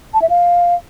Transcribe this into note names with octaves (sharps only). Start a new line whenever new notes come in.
A5
E5
F5